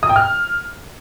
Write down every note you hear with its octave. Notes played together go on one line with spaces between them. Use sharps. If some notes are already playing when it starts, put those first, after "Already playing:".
D#6
G5
F6